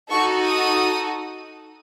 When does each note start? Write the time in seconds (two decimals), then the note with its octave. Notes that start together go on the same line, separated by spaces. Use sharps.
0.11 D#4 F#4 A4 C#6
0.46 D#6